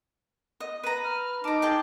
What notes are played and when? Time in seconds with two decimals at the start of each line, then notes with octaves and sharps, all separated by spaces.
0.60 D#5
0.83 B4 A#5 D#7
1.04 F6
1.44 D#4 A5 A#5 D6
1.62 G#4 G5 A5